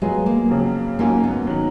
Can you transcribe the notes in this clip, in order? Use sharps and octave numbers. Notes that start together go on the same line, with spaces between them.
F#3 G#3 B3 F4 G#4
A#3
F2 C#3 F#3
G#2 F#3 A#3 C#4
B3
D#3 F#3